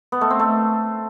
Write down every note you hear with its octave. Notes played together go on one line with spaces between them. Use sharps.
B3
A3
C4
A3